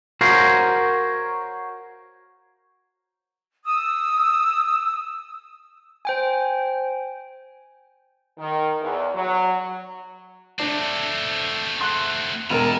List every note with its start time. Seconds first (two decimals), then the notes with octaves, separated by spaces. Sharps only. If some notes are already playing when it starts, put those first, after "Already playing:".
0.21 F#4 A#4 C5 C#5 F5
3.64 D#6 E6
6.05 C5 G5 G#5
8.39 D#3
8.82 E2
9.15 F#3
10.59 A3 C4 D4
11.81 C6 F#6
12.50 E1 A#4 G#5 A#5